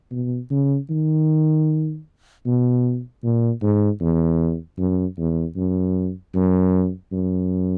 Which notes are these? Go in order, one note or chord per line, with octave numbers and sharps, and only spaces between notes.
B2
C#3
D#3
B2
A#2
G#2
E2
F#2
E2
F#2
F#2
F#2